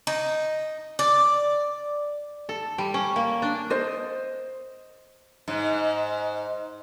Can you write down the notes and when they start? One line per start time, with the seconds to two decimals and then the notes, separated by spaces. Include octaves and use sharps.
0.07 D#4
0.99 D5
2.49 A4
2.78 G3
2.94 C#4
3.16 A#3
3.42 D4
3.70 C5 D#5
5.48 G#2